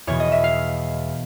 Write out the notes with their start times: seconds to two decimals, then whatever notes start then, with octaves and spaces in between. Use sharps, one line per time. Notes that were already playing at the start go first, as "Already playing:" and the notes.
0.07 E2 B2 C#5
0.20 D#5
0.32 E5
0.44 F5